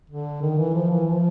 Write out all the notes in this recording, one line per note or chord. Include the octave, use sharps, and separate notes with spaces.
D3
D#3
E3
F3
E3
F3